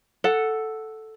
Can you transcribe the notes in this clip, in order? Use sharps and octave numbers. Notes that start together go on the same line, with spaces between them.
A4 F#5